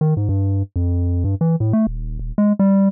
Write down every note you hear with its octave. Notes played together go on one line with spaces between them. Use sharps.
D#3
G#2
G2
F2
G2
E3
A2
A3
D#1
D#1
G#3
G3